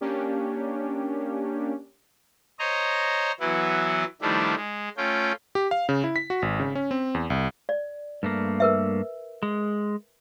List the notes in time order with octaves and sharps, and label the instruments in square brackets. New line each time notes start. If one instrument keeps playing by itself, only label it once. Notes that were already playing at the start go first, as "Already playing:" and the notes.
[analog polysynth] A#3 C#4 D4 G4
[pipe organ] C5 C#5 D#5 A#5
E3 F#3 B3 E4
D#3 F3 G3 A3 D4 E4
G#3
A3 C#4 F4 G5
[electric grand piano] G4
F5
C#3
E4
B6
F#4
G#1
C#3
C#4
C4
E2
C2
[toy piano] D5
[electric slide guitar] G2 A3 A#3
[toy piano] A#4 B4 E5
[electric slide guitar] G#3